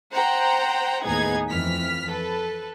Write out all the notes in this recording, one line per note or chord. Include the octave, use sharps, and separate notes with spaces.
C5 F#5 G5 A#5
D#2 A2 B3 D#4 G#4 G#6
F2 E3 F6 B6
A4 B4